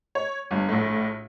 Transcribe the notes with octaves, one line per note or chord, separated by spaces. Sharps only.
C#5
G1 G2
A#1 A2